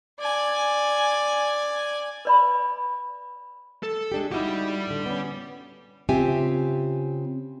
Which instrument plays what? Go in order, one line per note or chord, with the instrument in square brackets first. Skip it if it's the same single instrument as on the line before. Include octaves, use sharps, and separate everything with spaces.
[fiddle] D5 G#5
[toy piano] B4 D5 B5
[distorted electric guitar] A4
[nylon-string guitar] G#3 D4 G4
[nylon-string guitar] D#4 E4 F#4 [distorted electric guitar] G4 D5
[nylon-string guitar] A2 D3
B3 C#4
C#3 C4 F4 G4 E5 G#5